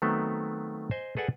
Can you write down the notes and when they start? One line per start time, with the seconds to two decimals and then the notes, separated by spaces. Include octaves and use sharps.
0.02 D#3 F#3 A3 B3 C4
0.91 C5 D#5 G#5
1.17 G#4 A4 B4 D5 F#5 G#5